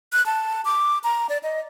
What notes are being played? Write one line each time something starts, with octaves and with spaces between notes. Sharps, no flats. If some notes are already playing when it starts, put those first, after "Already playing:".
F#6
A5
D6
A#5
D5
D#5